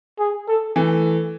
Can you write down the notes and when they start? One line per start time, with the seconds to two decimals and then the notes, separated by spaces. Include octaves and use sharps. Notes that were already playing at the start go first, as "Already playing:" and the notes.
0.19 G#4
0.48 A4
0.76 E3 A3